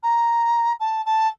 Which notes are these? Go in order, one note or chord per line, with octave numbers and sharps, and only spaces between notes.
A#5
A5
A5